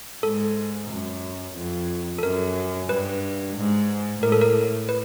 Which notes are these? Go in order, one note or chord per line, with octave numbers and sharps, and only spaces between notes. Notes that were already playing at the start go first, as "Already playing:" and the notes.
G#2 A4
F#2
F2
A4
F#2 A#4
G2 B4
G#2
A2 A#4
A4
A#4
B4